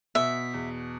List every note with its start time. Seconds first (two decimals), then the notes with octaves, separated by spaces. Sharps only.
0.15 B2 E5
0.54 E2